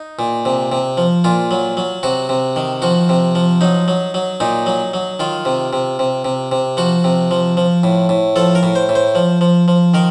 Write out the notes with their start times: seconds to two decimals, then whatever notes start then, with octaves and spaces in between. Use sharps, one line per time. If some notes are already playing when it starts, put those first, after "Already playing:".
Already playing: D#4
0.19 A#2
0.45 C3
0.72 C3
0.97 F3
1.24 A#2 F4
1.51 F#3
1.77 F#3
2.03 C3 F#4
2.29 C3
2.56 D#3
2.82 F3 F#4
3.09 C3
3.35 F3
3.61 F#3 D#4
3.88 F#3
4.14 F#3
4.40 A#2 D#4
4.66 F#3
4.93 F#3
5.19 D#3 F4
5.45 C3
5.73 C3
5.99 C3
6.24 C3
6.52 C3
6.77 F3 F#4
7.04 C3
7.31 F3
7.57 F3
7.83 A2
8.09 A2
8.36 F3 A4
8.55 A#4
8.63 A2
8.75 C5
8.89 A2
8.95 C5
9.15 F3
9.41 F3
9.68 F3
9.94 D#3 A#4